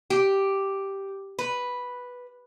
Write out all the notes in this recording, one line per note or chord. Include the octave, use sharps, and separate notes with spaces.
G4
B4